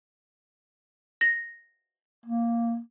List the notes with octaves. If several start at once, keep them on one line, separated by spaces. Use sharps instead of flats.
A#6
A#3